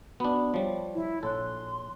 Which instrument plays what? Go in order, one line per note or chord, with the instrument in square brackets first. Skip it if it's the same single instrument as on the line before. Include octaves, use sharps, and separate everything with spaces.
[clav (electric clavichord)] B3 D4 [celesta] F#4 B5
[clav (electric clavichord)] F3 G3 [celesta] C#5
[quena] E4
[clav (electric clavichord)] A#1 A4 [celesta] C#5 F#6 [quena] C6